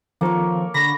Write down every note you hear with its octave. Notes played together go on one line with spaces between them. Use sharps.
D#3 F3 A#3 C4 A4 C#5
D3 B5 C#6 A#6